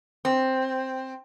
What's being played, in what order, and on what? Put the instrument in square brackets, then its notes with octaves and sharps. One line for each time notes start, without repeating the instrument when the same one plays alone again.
[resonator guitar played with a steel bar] C4